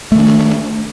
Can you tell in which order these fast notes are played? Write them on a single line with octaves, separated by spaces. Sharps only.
A3 D#3 D4